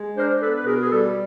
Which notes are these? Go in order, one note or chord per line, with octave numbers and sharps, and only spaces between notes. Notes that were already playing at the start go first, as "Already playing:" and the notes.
Already playing: G#3
D4 A#4 C5
B3 A4 B4
B4
B2 G#4 A#4
G#4
G3 G4 A4